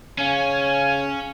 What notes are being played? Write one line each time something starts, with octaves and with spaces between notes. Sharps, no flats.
C#3 C#4 F5 G#5